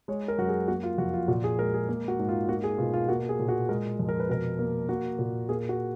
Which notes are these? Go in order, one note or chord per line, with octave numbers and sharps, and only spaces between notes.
G#3 C#5
A#4
F#2 F#4
G#4
A#3 F#4
F4
F2 F#4
F4
A#2 F#4
G#4
G#3 A#4
G#4
A#3
F#4
G#2
F4
A#3 F#4
G#4
B2 F4
F4
A#3 F#4
G#4
A#2
F#4
G#3 A#4
F2
A#4
B4
B2 A#4
A#3
A#3 F#4
A#2
A#3 G#4
F#4